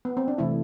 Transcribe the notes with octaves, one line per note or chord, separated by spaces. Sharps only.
B3
C4
D4
C3 E3 A3 E4